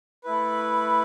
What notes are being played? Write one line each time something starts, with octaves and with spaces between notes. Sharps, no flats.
A3 E4 B4